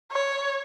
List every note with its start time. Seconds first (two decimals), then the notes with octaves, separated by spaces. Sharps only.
0.12 C#5